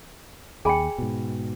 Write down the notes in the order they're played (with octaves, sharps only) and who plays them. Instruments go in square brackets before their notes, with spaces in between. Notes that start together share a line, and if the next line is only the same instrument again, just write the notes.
[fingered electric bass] D#2 [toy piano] G#4 G5 [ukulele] G#5 B5
[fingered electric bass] G#2 B2